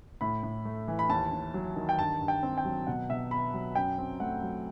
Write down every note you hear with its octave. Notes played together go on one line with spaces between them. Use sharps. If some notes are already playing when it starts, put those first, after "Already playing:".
A2 B5
A2
A3
E3
B5
D#2 A5
D#2
F#3
D#3
G5
G2 A5
G2
G5
C4
G5
F#3
B2 F#5
B2 E5
B3 B5
F#3
F#2 G5
C4
A3 F#5
F#3